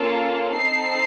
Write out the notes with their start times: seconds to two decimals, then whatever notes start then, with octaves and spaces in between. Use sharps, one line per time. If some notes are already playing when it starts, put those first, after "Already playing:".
Already playing: A#3 C#4 F4 A4
0.55 C4 D#4 A4 C7